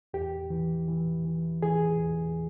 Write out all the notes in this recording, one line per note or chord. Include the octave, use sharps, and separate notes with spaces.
E2 G4
E3
E3
E3
E3 G#4
E2